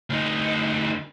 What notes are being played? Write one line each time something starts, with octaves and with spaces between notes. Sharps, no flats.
D2 D#4